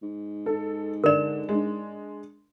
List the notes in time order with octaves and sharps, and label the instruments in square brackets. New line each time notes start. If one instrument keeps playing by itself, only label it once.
[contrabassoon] G#2
[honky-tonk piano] A4
[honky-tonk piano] D3 E7 [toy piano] A#4 D5
[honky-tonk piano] G#3 D4